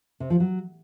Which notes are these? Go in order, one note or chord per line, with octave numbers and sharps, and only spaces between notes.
C3
F3
F#3